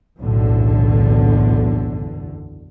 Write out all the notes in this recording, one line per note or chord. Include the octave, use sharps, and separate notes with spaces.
F#1 B1 E2 A2 D3